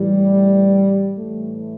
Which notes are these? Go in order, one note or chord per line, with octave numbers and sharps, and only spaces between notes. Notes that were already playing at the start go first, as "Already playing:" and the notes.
Already playing: A2 E3 G3
A2 E3 A3